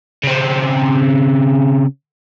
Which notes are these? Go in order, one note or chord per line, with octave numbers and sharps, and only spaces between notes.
C#3 C4